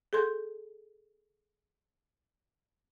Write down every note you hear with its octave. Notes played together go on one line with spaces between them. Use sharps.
G#4 A4 C6 G6